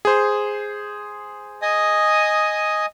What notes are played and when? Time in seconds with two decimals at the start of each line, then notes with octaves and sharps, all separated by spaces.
0.05 G#4 C5
1.62 D#5 G#5 D#6